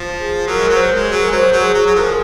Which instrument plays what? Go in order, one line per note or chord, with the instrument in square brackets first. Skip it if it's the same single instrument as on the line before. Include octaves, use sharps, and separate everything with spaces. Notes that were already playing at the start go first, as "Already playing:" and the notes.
Already playing: [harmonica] F3
[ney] G#4
[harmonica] F#3 [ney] A#4
[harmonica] G#3
F#3
[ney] C5
[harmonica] G#3
[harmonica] F#3 [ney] G#4
[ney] A#4
[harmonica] G#3
[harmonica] F#3 [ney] C5
[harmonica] F#3
[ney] G#4
[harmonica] F#3
[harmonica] F#3 [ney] G#4
[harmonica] F3 [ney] A#4
[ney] G#4